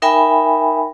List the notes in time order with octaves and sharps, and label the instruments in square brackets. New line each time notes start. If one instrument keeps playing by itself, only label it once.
[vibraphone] D#4 A#4 E5 G5 G#5 B5